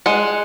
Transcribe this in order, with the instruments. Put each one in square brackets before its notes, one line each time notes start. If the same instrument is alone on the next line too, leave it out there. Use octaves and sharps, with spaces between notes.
[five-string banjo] G#3 F#5